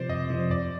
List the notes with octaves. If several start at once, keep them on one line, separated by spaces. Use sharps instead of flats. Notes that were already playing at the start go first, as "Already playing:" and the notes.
Already playing: C3 F3 C5 D5
F2 D#5
C3 F3
F2 D5